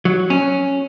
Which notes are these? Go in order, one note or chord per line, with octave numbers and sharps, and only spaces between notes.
F#3
C#4